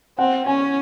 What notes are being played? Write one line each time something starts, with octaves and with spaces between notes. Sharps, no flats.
C4 F#5
C#4 G#5